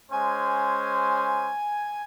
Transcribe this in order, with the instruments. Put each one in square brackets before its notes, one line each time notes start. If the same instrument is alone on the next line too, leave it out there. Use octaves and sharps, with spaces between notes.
[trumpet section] G#3 C#4 C5 [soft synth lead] G#5